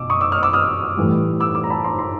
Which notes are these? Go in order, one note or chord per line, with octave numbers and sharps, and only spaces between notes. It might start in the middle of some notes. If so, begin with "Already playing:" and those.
Already playing: B2 D6 E6
C#6 D#6
D6 E6
D#6 F6
D6 E6
D#6 F6
A2 E3 G3
D6 E6
D6 E6
A#5
A5 B5
A#5 C6
A#5 C6